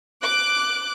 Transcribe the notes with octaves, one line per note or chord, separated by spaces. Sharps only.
D6 F#6